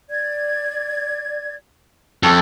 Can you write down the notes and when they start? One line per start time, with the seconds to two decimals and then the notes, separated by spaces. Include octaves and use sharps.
0.10 D5 G#6
2.23 F2 A4 C#6 D#6